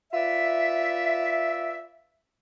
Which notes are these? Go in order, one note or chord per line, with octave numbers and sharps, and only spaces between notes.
F4 B4 D5 E5